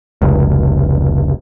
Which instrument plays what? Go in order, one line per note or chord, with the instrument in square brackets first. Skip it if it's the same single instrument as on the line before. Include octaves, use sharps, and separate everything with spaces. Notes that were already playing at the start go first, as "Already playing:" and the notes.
[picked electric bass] F1 C#2